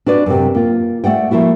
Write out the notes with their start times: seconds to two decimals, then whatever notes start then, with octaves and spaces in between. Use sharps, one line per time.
0.06 D4 F#4 B4 D5
0.26 F#2 C3
0.55 A#3 F4
1.04 A3 D5 F#5 G5
1.31 F3 A3 A#3 E4 F#4